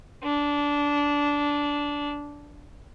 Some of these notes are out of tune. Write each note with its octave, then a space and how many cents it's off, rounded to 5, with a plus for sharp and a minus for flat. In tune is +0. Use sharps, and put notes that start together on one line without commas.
D4 -15